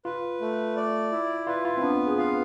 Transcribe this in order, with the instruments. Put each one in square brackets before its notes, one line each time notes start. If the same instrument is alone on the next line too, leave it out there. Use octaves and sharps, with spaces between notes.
[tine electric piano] F4 [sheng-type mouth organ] B4
[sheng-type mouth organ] A3
D5
E4
[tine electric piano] F4 [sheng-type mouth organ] B4
[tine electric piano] F4
C4
[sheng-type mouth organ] B3 [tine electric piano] D4
[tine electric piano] G#4
[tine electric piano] F4 [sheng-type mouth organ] F5